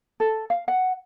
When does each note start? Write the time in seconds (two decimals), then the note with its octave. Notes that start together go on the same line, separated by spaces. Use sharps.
0.20 A4
0.50 F5
0.68 F#5